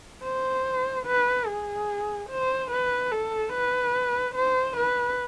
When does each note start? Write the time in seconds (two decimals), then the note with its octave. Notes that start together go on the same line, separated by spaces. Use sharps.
0.24 C5
1.06 B4
1.47 G#4
2.30 C5
2.71 B4
3.11 A4
3.53 B4
4.36 C5
4.77 B4